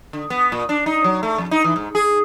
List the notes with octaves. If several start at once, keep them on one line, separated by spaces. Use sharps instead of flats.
D3
B3
A#2
D4
D#4
F#3
A3
F2
D#4
E3
G#2
G#4